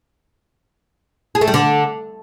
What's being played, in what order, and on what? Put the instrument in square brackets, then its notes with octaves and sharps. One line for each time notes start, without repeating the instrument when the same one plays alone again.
[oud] G#4
A3
G3
D3